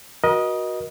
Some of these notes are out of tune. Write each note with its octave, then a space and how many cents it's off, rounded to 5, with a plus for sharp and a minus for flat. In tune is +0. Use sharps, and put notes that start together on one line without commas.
F#4 +0 A#4 +40 D#5 +0